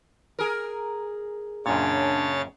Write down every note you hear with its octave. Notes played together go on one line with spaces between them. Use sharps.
G#4 A#4
F#2 A#2 C#3 C#4 D4 C#5 A6